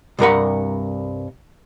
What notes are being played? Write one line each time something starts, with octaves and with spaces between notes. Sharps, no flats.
C2 G2 A#4 F#5